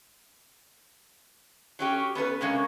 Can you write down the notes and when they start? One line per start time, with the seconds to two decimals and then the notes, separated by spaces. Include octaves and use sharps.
1.79 F#3 C#4 G4
2.15 B3 C#4 A4 B4
2.41 C3 G#3 A#3 C#4